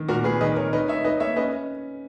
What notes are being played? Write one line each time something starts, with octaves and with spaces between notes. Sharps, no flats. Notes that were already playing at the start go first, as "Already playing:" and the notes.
Already playing: D#3
A#2 F#4 A#4
A#2 G#4 B4
D#3 B4 D#5
D#3 A#4 C#5
D#4 B4 D#5
D#4 C#5 E5
D#4 B4 D#5
A#3 C#5 E5
C#4 B4 D#5